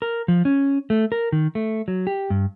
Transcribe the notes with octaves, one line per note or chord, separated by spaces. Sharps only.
A#4
F3
C#4
A3
A#4
D#3
A3
F#3
G4
G2